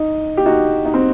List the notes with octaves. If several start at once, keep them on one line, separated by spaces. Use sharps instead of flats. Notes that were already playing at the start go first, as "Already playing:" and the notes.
Already playing: D#4
G4
D#4 F#4
D#4
C4